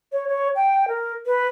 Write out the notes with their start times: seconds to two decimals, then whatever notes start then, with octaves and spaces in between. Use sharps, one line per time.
0.12 C#5
0.28 C#5
0.56 G5
0.88 A#4
1.26 B4